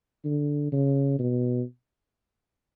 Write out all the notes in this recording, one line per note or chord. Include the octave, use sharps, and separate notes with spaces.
D3
C#3
B2